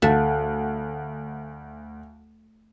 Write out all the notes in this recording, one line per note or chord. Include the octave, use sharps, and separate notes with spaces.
D2 A3 F5 F#5 A5